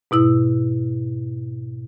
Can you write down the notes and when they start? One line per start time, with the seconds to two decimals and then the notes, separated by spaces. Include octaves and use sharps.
0.11 G#2 B2 E4 E6